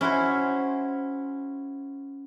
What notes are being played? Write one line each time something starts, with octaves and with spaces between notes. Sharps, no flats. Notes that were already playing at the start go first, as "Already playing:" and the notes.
C#4 E4 F#4 C5